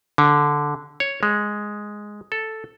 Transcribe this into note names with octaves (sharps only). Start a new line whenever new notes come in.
D3
C#5
G#3
A4